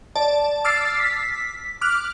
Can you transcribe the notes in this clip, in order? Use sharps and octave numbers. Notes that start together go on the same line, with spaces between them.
D5 A5
D6 E6 F6 A6 C7
B6
D6 F6 F#6